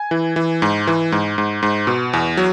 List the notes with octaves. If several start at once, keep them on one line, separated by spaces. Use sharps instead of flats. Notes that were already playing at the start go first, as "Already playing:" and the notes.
Already playing: G#5
E3
E3
G#2
E3
G#2
G#2
G#2
B2
E2
F#3